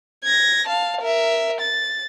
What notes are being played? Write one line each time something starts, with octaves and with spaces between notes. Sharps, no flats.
G#6 A#6
F5 A5
A#4 E5
A6